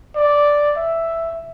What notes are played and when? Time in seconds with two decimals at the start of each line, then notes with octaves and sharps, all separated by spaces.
0.16 D5
0.77 E5